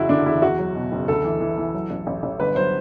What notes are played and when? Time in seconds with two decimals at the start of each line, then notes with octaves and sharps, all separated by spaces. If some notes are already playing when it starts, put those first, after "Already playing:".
Already playing: F#1 E2 E4 F#4
0.09 D3 D4
0.26 E2 E4
0.42 E2 F#4
0.59 F#3
0.75 B2
0.92 F#1
1.08 D2 A4
1.24 E3
1.40 E3
1.58 E3
1.74 F#3
1.90 A1
2.07 A1
2.23 A1
2.39 G1 B4
2.56 F#3 C5